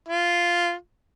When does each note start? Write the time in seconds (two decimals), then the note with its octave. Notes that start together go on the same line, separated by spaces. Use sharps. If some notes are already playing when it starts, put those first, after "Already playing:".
0.08 F4